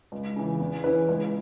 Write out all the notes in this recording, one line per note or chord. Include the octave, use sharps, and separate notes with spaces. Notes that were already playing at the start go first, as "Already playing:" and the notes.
C#2
C#3 E3
E2
E3 C#4 E4 B4
C#2